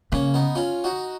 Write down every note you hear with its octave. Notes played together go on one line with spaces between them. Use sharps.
C#3 A#3 C#4
B3 D#4
C#4 F4
D#4 F#4